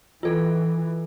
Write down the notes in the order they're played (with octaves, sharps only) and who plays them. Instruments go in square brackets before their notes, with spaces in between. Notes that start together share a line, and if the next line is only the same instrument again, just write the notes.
[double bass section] E3 [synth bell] F4 A4